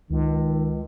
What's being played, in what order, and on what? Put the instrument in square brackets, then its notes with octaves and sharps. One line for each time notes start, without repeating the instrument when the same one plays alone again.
[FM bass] C#2 [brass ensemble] D#3